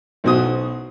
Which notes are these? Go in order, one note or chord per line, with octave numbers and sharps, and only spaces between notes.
B1 B2 F#4 C5 D#6